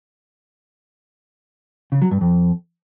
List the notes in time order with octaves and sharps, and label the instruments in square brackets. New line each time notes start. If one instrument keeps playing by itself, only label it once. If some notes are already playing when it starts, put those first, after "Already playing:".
[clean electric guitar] C#3
F#3
G2
F2